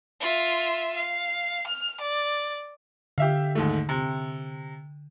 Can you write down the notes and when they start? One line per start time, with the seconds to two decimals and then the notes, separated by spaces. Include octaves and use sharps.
0.21 F4 E5
0.96 F5
1.67 F6
2.01 D5
3.18 D3 G4 E5 F5
3.55 D#2 G#2 A3
3.89 C3